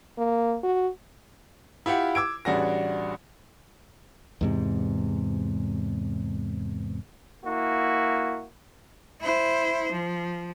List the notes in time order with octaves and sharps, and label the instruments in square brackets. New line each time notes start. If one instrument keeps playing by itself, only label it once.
[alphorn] A#3
F#4
[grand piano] E4 F4 G4 F#5
D6 E6 G#6 D7
A1 G3 D4 F#4 G#4 A#6
[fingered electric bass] E2 G#2 C3
[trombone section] A#3 E4 F#4
[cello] E4 C5
F3